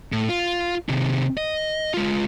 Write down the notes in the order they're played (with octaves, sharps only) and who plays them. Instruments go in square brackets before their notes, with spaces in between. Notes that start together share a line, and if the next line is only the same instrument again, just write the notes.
[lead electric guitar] A2
F4
C3 D#3
D#5
G#3 F4